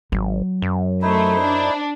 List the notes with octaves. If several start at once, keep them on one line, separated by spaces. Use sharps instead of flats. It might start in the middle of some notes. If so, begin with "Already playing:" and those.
G#1 F#3
F#2
A3 D#4 E4 C5
D4